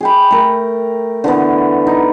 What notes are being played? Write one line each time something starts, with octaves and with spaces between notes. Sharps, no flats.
G#4 G5 B5
A3 A#4
D3 E3 A3 B3
D#4